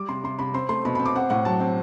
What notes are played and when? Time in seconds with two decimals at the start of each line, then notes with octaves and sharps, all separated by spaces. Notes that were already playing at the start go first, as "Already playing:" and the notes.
Already playing: G3 D6
0.09 C3 C6
0.24 C3 C6
0.39 C3 B5
0.54 C4 C6
0.69 A3 C6
0.85 B2 B5
0.95 B5
0.99 C4
1.06 D6
1.15 C4 F#5
1.30 A2 F#5
1.45 F#3 A5
1.60 C4